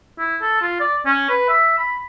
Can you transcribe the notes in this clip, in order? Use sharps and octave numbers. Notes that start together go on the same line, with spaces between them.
E4
A4
F4
D5
C#4
B4
E5
B5